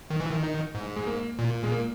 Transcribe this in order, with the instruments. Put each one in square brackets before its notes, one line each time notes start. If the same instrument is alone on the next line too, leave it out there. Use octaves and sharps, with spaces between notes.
[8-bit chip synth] D#3
E3
D#3
[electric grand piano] D#4
[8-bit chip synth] G#2
[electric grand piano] G#3
A#3
[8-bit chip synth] A#2
[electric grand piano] G#3
A#3